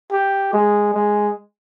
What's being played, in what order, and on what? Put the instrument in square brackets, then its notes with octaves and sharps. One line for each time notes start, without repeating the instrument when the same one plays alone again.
[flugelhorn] G4
G#3
G#3